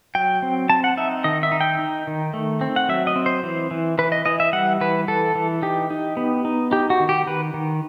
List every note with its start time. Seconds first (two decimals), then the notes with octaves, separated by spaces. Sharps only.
0.15 F#3 G5
0.43 C4
0.70 C4 A5
0.84 F#5
0.97 D#4 E5
1.24 D#3 D#5
1.43 E5
1.52 D#4
1.61 G5
1.79 D#4
2.07 D#3
2.34 A3
2.61 C4
2.76 F#5
2.88 F#3 E5
3.07 D#5
3.16 C4
3.26 C5
3.43 E3
3.71 E3
3.98 E3 B4
4.12 D#5
4.26 E3 D#5
4.40 E5
4.53 G3 F#5
4.81 E3 B4
5.08 E3 A4
5.35 E3
5.62 D#4 G4
5.90 D#4
6.17 B3
6.45 D#4
6.72 D#4 G4
6.90 F#4
7.00 D#3
7.09 G4
7.27 D#3 B4
7.54 D#3